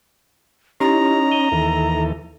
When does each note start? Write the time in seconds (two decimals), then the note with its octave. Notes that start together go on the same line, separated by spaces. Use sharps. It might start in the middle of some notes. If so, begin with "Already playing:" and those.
0.80 C#4 D#4 E4 G4 A#5
1.31 D#7 G7
1.52 D#2 E3 A4